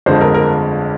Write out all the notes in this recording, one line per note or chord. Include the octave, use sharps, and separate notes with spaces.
G1 F2 D3 G#3 C5
A#4
A#4